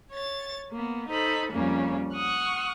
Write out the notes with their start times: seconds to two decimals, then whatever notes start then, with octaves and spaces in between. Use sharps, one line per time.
0.12 C#5 A6
0.72 A#3 B3
1.10 D#4 A4 C5 B5
1.52 F2 C#3 G3 A#3 C#4
2.15 F#5 C#6 D#6 F6 F#6